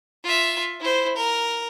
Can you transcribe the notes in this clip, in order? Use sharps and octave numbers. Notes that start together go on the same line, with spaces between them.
F4 E5
E4 C5
A#4